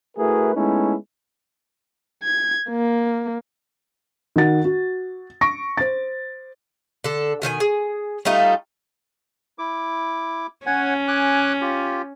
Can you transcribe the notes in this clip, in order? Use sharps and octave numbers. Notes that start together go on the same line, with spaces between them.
A3 E4 F#4 G#4 A#4 B4
G#3 A3 B3 C#4 D#4 E4
G#6
A#3
D#3 F#4 F#5 A6
F#4
C#6 A#6 D7
C5 A6
D3 A4
B2 D#3 A4 G#5
G#4
G3 A3 D#4 F4
E4 D6
C#4 C#5 F#5 G#5
G#5 D6 F#6
F4 G4